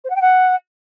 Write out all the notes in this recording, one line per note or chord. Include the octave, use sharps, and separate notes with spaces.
C5
F#5
G5
F#5